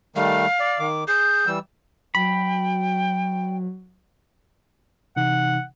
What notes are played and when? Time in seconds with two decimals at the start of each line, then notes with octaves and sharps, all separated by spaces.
0.16 D#3 G3 A3 F5
0.60 D5
0.80 D#3 D6
1.08 G#4 G6
1.47 E3 G3 E6
2.15 F#3 G5 B5
5.16 C3 E3 D#4 F#5